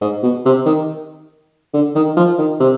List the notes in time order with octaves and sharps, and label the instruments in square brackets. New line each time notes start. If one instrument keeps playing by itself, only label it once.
[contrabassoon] G#2
B2
C3
D#3
D3
D#3
F3
D#3
C3